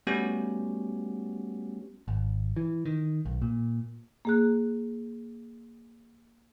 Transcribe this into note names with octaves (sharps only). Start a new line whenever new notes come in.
G3 A3 B3 C#4 F#4 G4
G#1
E3
D#3
B1
A#2
A#3 G#4 F#6